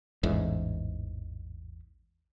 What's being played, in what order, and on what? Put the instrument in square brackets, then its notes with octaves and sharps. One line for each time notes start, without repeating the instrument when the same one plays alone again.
[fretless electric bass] A1 E2 G#2